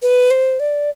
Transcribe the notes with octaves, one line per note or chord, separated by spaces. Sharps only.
B4
C5
D5